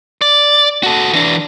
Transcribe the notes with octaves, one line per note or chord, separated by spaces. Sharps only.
D5
F#4 A4
E3 D4